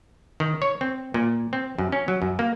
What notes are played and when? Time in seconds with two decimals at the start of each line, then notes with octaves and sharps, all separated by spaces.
0.40 D#3
0.62 C#5
0.81 C4
1.14 A#2
1.53 C4
1.78 F#2
1.92 C#4
2.08 F#3
2.22 F#2
2.39 A#3